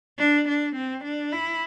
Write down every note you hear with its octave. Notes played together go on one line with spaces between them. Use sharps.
D4
D4
C4
D4
E4